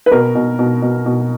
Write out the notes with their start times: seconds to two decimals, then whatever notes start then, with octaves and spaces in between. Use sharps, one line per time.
0.06 B4
0.11 B2 A#4
0.35 B2
0.59 B2
0.82 B2
1.06 B2